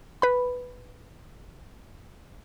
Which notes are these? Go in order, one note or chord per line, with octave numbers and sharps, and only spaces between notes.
B4 B5